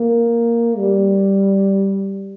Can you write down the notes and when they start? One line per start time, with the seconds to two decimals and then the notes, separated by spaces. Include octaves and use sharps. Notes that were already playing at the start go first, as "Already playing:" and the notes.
Already playing: A#3
0.77 G3